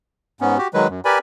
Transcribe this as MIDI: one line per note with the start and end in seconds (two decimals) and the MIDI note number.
0.41 0.58 44
0.41 0.58 59
0.41 0.58 61
0.58 0.68 66
0.58 0.68 67
0.74 0.87 51
0.74 0.87 54
0.74 0.87 56
0.74 0.87 71
0.90 1.00 42
1.05 1.19 67
1.05 1.19 70
1.05 1.19 71
1.05 1.19 74
1.05 1.19 80
1.05 1.19 83